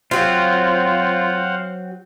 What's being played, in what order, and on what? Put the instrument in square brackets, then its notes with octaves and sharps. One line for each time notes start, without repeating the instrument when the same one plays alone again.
[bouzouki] F#3 C4 [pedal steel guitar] F4 [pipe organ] C5 F5 F#5